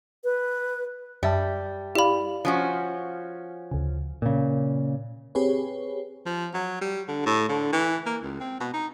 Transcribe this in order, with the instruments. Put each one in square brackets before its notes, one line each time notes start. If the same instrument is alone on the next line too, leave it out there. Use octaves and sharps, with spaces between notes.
[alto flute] B4
[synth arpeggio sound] F#2 E5 A5 [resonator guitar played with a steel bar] G3
[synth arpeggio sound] E4 D5 F5 [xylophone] G4 B5
[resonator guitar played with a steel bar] F3 C#4 F#4
[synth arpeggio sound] D2 C#3
[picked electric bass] A#2 C#3
[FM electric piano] C4 G4 G#4 B4 C#5
[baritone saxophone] F3
F#3
G3
D3
A2
D3
E3
A#3
C#2
C4
B2
D#4